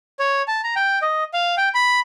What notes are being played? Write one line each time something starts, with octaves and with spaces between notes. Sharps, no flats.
C#5
A5
A#5
G5
D#5
F5
G5
B5